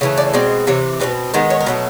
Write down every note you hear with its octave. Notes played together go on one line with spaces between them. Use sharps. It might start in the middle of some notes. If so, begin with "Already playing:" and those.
C#3 E3 A3
D5
B2 G#3 C4 D5
C3 E3 C#5
B2 G3 C4 B4
D#3 G#3 B3 C5
C#5
A#4
B2 F#3 A3 B4